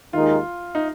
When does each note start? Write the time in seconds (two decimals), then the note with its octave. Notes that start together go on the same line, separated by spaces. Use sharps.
0.13 D#2 D#3 G#3 D#4 F4 A#4
0.75 D#4